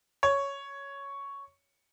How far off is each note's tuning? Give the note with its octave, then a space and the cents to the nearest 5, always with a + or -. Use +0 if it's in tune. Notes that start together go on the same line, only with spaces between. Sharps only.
C#5 +5